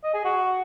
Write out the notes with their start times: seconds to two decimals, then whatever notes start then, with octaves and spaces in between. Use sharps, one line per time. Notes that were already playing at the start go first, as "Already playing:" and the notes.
0.04 D#5
0.14 G#4
0.24 F#4